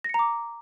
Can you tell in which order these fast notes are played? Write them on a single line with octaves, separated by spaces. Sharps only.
A#6 C#7 A#5 D6